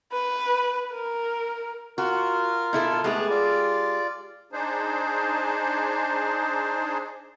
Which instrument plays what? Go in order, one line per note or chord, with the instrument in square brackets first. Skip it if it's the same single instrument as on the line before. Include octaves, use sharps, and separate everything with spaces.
[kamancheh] B4
A#4
[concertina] F4 A#4 [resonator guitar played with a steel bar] F#4
[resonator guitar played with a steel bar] B2 E4 A4
[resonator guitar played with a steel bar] G#3 G4 G#4 [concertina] A3 B3 A5
[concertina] F4 D5
[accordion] D4 D#4 G#4 C5